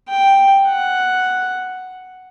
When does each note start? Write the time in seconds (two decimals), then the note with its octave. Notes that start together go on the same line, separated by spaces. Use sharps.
0.09 G5
0.68 F#5